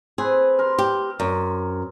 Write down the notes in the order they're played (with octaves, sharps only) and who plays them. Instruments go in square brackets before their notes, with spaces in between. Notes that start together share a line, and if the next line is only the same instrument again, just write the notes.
[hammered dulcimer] C4 B4 [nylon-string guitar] G#4
[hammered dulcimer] A#4 C6
[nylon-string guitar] G4
F#2